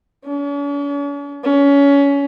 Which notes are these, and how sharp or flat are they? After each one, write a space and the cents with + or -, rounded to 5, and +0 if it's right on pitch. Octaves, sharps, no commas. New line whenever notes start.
C#4 +45
C#4 +25